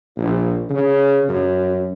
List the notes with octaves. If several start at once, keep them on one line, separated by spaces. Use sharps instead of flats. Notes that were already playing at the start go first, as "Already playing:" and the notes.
A#1
C#3
F#2